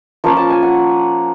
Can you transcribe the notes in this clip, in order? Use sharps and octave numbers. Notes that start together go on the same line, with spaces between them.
F3 A#3 C#4 F4 A5
A5
G#5
F#5